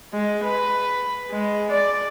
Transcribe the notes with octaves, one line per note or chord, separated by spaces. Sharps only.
G#3
B4
G#3
D5